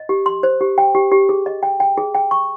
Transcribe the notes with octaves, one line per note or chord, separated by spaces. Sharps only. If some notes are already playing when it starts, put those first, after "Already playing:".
Already playing: D#5
G4
C6
C5
G4
G5
G4
G4
G#4
D#5
G5
G5
G#4
G5
C#6